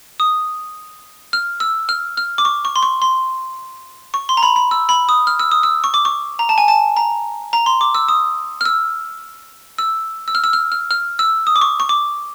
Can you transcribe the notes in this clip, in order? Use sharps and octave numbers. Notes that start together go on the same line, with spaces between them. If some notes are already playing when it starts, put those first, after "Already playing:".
D#6
F6
E6
F6
F6
D6
C#6
C#6
C6
C#6
C6
C#6
C6
A#5
B5
B5
E6
B5
D#6
F6
E6
D#6
E6
C#6
D6
C#6
A#5
A5
G#5
A5
A#5
A#5
C6
D6
E6
D#6
F6
E6
E6
E6
F6
E6
F6
F6
F6
E6
D#6
D6
C#6
C#6
D6